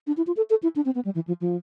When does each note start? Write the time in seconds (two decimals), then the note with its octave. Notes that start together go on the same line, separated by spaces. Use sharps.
0.07 D4
0.17 E4
0.27 F4
0.37 A4
0.50 A4
0.63 E4
0.76 D4
0.85 C4
0.95 B3
1.05 G3
1.15 E3
1.27 F3
1.41 F3